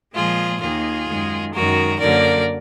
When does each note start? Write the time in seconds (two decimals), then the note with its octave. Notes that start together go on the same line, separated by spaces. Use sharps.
0.14 A#2 F3 G#3 F4 G#4
0.60 D#2 D#3 A#3 F4 G#4
1.07 F#2 D#3 G#3
1.53 F#2 D#3 G#3 F#4 A#4
1.99 F#2 D3 F#3 A#3 A#4 D5